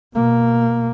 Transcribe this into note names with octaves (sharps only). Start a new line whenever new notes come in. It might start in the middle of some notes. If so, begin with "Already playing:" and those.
B2 A#3